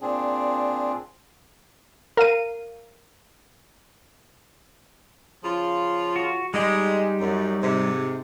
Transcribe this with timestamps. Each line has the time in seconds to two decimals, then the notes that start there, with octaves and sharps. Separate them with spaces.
0.01 A#2 C4 D4 G#4
2.17 A#4 F5 D#7
5.44 C#3 F3 F4
6.16 F#4
6.54 G3 G#3 D#4 G4
7.20 F#2
7.62 G#2 C3